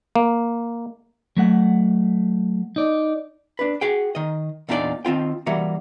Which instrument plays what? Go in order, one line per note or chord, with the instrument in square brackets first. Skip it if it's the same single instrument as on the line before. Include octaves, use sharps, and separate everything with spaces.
[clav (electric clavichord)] A#3
[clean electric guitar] F#3 A3 F#5
D#4 D5
[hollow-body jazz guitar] D4 B4
F#4 G#4 G5
D#3 D#5
E2 A#2 D4 D#4 F#4 D5
D#3 C4 F4 G5
E3 G3 A#3 F#4